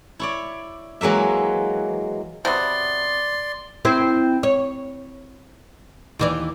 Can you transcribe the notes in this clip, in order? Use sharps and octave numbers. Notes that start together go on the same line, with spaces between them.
E4 C#5 D5
E3 F#3 G#3 A#3 E5
C3 F#3 B3 D5 C6
C4 E4 C5
C#5
D#2 E3 D5